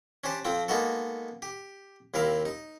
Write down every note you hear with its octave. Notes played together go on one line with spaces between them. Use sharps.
C#4 D4 G4 C5
F2 F3 C4 G5
G#3 A#3 B3 D#4 F#4 A4
G4
D#2 C3 E4 A#4 F5
D#4